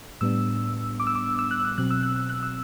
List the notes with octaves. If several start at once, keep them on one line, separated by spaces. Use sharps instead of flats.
A2 G3 B3 D4 E6
D6
E6
D6
E6
F#6
E6
B2 F#3 C4 F#6
E6
F#6
E6
F#6
E6